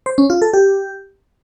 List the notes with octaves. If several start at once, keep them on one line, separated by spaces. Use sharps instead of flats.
C5
C#4
F4
A4
G4